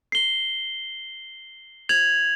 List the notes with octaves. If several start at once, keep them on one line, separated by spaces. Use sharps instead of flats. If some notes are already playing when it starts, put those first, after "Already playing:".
C7 G7
G#6 F7 F#7